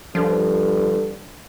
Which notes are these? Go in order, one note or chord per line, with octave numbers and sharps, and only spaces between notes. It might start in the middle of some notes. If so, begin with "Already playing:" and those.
G2 D3 F3